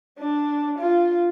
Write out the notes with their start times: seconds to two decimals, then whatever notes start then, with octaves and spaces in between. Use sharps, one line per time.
0.19 D4
0.79 F4